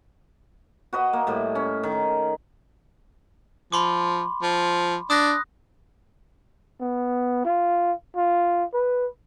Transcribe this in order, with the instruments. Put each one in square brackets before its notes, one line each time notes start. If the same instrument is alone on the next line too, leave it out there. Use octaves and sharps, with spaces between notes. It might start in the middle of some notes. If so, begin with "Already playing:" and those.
[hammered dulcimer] F#4 B4 D#5
A#3
A2 G3
C#4
D#3
[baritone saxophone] F3 [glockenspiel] B5 C6 D6
[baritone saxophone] F3
[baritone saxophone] D4 [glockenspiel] D#6 F#6 A#6
[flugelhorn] B3
F4
F4
B4